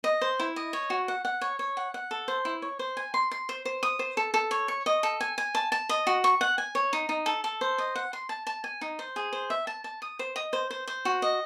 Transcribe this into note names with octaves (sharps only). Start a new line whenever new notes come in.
D#5
C5
E4
D#5
C#5
F#4
F#5
F#5
C#5
C#5
F#5
F#5
A4
C5
E4
C#5
C5
G#5
C6
C6
C5
C5
D#6
C5
A4
A4
C#5
C#6
D#5
A4
G#5
G#5
A5
A5
D#5
F#4
C#6
F#5
G#5
C#5
D#4
D#4
A4
A4
C5
D#5
F#5
C6
A5
A5
G#5
D#4
C5
G#4
C5
E5
A5
A5
D#6
C5
D#5
C5
C5
C5
F#4
D#5